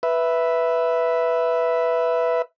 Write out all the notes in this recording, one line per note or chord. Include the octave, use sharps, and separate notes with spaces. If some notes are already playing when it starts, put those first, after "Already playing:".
B4 E5